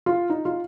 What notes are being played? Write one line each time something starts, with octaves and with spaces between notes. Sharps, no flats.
F4
D#4
F4